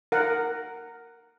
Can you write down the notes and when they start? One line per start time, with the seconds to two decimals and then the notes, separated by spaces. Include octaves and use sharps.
0.12 A#4 F#5